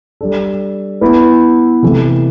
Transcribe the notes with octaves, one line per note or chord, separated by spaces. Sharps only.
G3 D4 A4
B3 E4 B4
C3 E3 A3